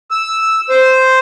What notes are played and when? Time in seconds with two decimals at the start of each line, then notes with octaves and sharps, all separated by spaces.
0.11 E6
0.70 C5